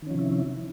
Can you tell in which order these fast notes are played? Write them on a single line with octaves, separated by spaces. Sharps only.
D#3 C#4 F3 C3 E4